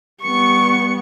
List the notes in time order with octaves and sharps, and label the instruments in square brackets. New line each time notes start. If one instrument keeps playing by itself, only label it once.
[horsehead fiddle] G3 B3 [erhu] C#6 [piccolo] C#7